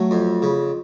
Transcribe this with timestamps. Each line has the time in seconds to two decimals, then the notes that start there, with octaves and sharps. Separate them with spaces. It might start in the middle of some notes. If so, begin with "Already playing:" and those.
Already playing: F#3 A3
0.11 F2
0.42 C#3